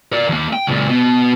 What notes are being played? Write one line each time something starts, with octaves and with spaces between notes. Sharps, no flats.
A#4 D5
D#2 A#3
G5
C#2 A#2
B2